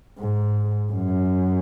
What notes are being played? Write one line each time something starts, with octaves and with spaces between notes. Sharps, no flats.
G#2
F#2